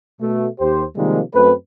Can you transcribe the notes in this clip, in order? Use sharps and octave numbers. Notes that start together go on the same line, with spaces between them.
B2 A3
D#2 G4 C5
C3 D#3 F3 G3 G#3 A#3
F#2 A3 C4 B4